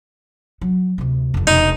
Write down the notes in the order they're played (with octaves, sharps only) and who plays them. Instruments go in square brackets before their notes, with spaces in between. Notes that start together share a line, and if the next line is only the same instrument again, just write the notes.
[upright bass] F#3
D2 C3
F1 F2
[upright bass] E1 C3 [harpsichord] D#4